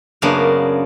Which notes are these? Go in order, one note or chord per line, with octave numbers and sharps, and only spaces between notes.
F#2 C#3 A#3 B3 D4